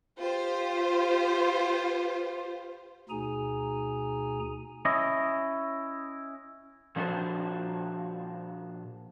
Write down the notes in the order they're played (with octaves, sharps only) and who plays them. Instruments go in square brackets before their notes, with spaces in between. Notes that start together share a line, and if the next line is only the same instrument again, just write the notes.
[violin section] F4 G4 C5
[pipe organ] D2 B2 D#4 G#4 G#5 A#5
[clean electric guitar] C#4 E4 D#5
[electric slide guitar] A#2 F3 D4 F#4 B4 C5